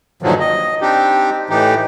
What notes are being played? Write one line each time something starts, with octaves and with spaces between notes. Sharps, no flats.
G2 A#2 D3 D#3 F3 F#3
D#5
C4 D4 D#4 G4
A2 E3 D#4 G4